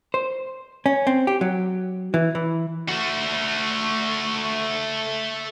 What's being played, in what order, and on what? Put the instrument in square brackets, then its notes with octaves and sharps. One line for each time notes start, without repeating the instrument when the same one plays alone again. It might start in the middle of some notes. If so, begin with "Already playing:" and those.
[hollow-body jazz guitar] C5
C#4
C4
G4
F#3
E3
E3
[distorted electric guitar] A3 F#4